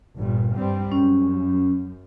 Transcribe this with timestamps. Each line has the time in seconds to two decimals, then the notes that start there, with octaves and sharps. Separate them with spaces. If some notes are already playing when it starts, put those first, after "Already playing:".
0.17 G1 G2 A#2
0.56 G2 G3 C4
0.92 F#2 C#4